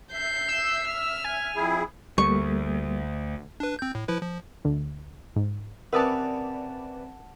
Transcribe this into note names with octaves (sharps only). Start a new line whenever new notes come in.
E5 G6 C7
E6
F6
G#5
F2 E4 G#4
D2 G3 A3 A#3 C#6
D4 B4
C4 G6
A2
F3 E4 B4
F3
D2
G#2
C3 C#4 A#4 B4 D5 F#5 A5 D#6